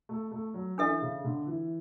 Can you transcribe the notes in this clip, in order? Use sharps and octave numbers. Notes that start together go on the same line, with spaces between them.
A3
A3
F#3
E3 D4 A4 E5
C#3
D3
E3